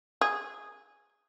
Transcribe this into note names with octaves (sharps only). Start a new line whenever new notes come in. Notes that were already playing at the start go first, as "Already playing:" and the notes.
G#4